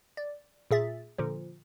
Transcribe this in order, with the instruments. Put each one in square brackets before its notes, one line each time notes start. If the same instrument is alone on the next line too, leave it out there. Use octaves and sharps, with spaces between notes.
[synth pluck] D5
A#2 G#4 E5 A6
A#2 D3 F3